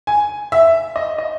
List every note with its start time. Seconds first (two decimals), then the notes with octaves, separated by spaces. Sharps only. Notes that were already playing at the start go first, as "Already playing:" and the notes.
0.07 G#5
0.52 E5
0.96 D#5
1.18 D#5